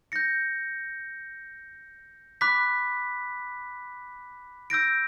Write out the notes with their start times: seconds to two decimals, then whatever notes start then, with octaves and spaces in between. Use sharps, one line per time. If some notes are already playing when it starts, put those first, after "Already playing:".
0.12 G6 A#6 C#7
2.41 B5 D6 F#6 B6
4.70 E6 G6 A#6 D7